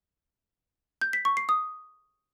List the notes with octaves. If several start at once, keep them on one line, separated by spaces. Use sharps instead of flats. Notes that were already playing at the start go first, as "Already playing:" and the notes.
G6
B6
C#6
C7
D#6